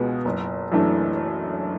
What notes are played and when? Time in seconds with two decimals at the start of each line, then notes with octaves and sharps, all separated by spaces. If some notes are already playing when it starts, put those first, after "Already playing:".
Already playing: C#2 B2 G#3 B3
0.25 F#1
0.72 F#2 E3 A3 D4